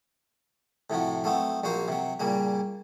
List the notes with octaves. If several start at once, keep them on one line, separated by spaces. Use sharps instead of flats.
A2 C3 F3 F#4
F#3 A3 B3 C4
A#1 F#3 A#3 F#4 C5
C3 F#3
A#2 C#3 G3 A#3